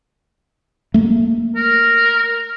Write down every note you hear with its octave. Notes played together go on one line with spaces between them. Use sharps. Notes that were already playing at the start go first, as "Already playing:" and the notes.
A3 A#3
A#4